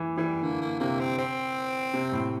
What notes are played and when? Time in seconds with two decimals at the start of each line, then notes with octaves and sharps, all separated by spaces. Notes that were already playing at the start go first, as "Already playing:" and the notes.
Already playing: E3
0.17 E3 G3
0.43 D3 A#3
0.62 A#3
0.80 C3 A#3
1.00 C4
1.18 C4
1.94 C3
2.12 A2